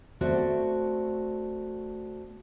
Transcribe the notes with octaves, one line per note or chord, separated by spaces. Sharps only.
A3 C4 F#4 D5